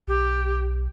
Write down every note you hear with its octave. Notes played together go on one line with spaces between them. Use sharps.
B1 G4